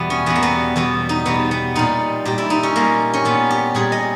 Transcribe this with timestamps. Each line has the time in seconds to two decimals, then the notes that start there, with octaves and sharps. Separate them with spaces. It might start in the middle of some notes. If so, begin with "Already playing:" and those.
Already playing: E2 B2 G3 B3
0.10 C#4
0.26 E2 B2 G3 B3
0.35 A#3
0.42 B3
0.76 E2 B2 G3 B3
1.09 D#4
1.25 E2 B2 G3 B3
1.51 B3
1.75 A#2 G3 D#4
2.25 A#2 G3 G4
2.38 E4
2.50 D#4
2.63 C#4
2.76 A#2 G3 A#3
3.13 C#4
3.25 A#2 G3 B3
3.50 G4
3.74 A#2 G3 G#4
3.92 D#5